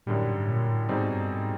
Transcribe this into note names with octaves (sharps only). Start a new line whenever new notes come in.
F#2 A2 D3 G3
G#2
A#2
A2
G#2 B2 G3 C4 D#4 G#4
G2
G#2